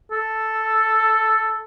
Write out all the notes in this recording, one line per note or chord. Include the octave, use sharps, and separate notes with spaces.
A4